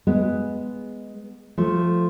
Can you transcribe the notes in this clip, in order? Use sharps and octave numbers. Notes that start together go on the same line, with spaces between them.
G#3 B3
F3 A3